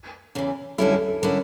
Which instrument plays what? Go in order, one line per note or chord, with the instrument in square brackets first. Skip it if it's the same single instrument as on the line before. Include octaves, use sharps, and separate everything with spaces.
[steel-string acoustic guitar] E2 C#3 E3
[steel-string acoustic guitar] G2 D3 G3 C#4 E4 [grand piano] A4
[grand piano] A4
A4
[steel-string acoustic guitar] D3 G3 C#4 E4 [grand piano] A#4